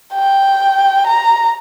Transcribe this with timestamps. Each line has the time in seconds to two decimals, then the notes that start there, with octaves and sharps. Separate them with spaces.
0.14 G5
1.06 A#5